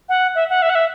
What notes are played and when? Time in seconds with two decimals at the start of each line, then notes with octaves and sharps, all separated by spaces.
0.09 F#5
0.35 E5
0.50 F#5
0.62 E5
0.69 F#5
0.75 E5